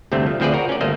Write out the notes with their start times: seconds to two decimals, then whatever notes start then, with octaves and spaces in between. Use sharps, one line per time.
0.12 D2 G2 C3 A3 C4
0.27 F3
0.40 D2 F3 C4 G#4 B4 D5
0.54 F#4 A#4
0.69 C#4 D5
0.81 G1 A3 A#3 C5 D#5